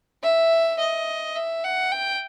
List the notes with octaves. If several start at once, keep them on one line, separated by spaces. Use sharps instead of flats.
E5
D#5
E5
F#5
G5